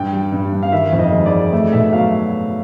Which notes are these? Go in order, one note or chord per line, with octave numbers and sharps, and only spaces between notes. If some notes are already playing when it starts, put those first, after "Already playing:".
Already playing: G2 G5
G3
G2
G2
F5
D#3 E5
F2
D#5
G#3
D5
D#3
A3 E5
B2 E5
F#3 F5